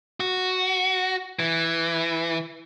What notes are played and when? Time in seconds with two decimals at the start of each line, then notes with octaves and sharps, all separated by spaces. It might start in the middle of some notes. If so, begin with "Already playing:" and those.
0.20 F#4
1.39 E3